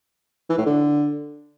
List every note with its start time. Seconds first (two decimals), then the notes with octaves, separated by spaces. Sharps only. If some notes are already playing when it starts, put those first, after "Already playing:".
0.50 E3
0.58 A2
0.66 D3